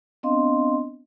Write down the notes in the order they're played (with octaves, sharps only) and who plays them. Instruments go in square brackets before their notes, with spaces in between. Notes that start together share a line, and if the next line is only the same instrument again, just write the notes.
[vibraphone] B3 C4 D4 D#5 F5 C6